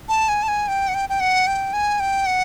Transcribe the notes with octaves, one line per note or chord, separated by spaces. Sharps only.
A5
G#5
A5
G#5
G5
F#5
G5
G5
F#5
G5
G#5
G5
F#5